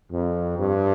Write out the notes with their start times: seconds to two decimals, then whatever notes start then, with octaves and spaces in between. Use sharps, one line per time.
0.12 F2
0.59 G2